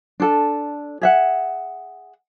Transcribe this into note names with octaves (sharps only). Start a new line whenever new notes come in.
D4 A4
G#4 E5 F#5